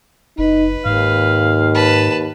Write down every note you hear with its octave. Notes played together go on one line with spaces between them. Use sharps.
F#1 D#4 B4
D#2 G#2 F5
B4 A5